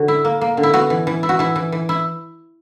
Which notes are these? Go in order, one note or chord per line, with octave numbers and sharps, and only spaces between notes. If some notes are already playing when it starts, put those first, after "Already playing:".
Already playing: D3 F#4
E4
A#3
A#3
D3
E4
B3 F#4
E3
E3
E4
F#4
E3 E4
E3
E3
E4